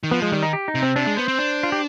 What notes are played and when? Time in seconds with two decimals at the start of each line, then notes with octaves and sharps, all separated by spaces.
0.03 D#3
0.11 F3 B3
0.22 G#3
0.32 D#3 G3
0.43 D#4
0.53 G4
0.68 D#4
0.75 C3
0.83 C4
0.96 C3 D4
1.07 G#3
1.17 B3 C5
1.28 C4
1.39 D4
1.63 F4
1.72 G4